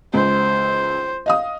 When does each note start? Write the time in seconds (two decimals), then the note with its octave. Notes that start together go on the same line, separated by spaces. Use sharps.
0.14 C#2 C5
1.26 D#5 F5 D#6